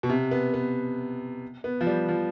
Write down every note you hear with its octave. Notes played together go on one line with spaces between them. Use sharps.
B2
C3
B3
B3
B3
F3
G3
F3